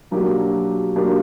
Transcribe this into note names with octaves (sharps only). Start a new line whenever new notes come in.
B2 F#3 A#3 D4 G4
B2 F#3 A#3 D4 G4